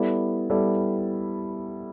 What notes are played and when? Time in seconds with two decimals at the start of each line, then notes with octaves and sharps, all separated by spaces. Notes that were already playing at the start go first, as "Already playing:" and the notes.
Already playing: G3 B3 E4 A4 D5
0.50 G3 B3 E4 A4 D5